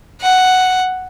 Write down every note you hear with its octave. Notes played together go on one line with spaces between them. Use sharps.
F#5